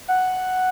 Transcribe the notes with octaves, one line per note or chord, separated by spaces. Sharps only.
F#5